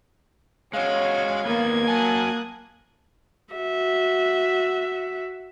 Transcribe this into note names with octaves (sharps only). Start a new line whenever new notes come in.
G#3 C#4 F#4 C#5 F5
D#2 A#3 B3 G#6
F#3 G#5 A5 D#6 F#6
F#4 E5